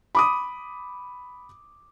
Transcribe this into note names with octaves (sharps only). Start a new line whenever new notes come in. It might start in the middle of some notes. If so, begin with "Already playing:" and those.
B5 D6 D#6